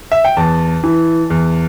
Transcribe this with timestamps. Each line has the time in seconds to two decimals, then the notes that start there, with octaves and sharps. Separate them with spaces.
0.12 E5
0.24 G5
0.37 E2 A5
0.84 E3
1.30 E2